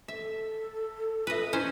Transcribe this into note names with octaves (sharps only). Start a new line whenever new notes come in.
A4 E5
F4 B4 D#5 E5
C#4 D4 E4 C5